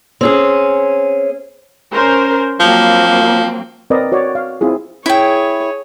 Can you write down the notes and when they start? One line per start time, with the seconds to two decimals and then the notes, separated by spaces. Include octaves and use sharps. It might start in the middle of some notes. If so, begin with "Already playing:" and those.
0.21 C4 C#4 G#4
1.90 C#4 A#4 C5
2.60 F3 F#3 A#3 C4
3.90 C4 A#4 B4 D5 D#5
4.12 F#4 C#5 D5
4.35 F5
4.61 C4 E4 F4 G#4
5.06 E4 G#4 C#5 G5